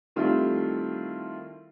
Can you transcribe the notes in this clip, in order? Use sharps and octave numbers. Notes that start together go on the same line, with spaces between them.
D#3 G3 A3 C4 E4 F4